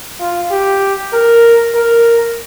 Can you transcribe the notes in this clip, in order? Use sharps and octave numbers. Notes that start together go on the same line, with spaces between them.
F4
G4
A#4
A#4